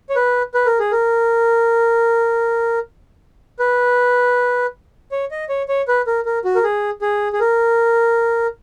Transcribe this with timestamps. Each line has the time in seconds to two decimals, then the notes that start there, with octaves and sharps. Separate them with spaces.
0.10 C#5
0.16 B4
0.54 B4
0.66 A#4
0.79 G#4
0.92 A#4
3.59 B4
5.12 C#5
5.31 D#5
5.49 C#5
5.68 C#5
5.88 B4
6.07 A#4
6.25 A#4
6.45 F#4
6.55 A#4
6.64 G#4
7.02 G#4
7.33 G#4
7.40 A#4